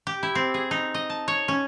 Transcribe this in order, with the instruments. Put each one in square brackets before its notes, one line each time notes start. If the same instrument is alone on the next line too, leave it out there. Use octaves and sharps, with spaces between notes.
[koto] G4
E4
C4
G#4
D#4
D#5
A5
C#5
C#4